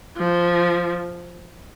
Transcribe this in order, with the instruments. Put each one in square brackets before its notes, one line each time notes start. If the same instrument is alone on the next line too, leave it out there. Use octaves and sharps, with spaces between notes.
[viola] F3